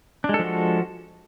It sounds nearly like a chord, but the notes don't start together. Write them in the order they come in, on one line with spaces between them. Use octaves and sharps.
D4 G#3 A4 F3 F#4